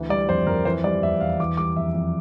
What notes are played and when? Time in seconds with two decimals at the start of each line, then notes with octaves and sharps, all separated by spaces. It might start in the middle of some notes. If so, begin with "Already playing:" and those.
Already playing: D2 E3
0.09 G3 D5
0.28 F2 C5
0.47 F2 A#4
0.65 E3 C5
0.84 G3 D5
1.03 E2 E5
1.20 E2 F5
1.40 E3 D6
1.57 G3 D6
1.76 F2 E5
1.95 F2